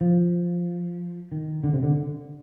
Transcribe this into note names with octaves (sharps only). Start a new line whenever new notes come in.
F3
D#3
D3
C3
D3